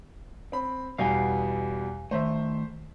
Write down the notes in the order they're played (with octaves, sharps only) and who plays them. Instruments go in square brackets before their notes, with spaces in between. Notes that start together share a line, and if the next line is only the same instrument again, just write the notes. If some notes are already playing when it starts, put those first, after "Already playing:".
[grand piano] C4 B5
[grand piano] E2 B2 G3 [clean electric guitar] F5 G#5
[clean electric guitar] D#3 A3 [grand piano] C5 E5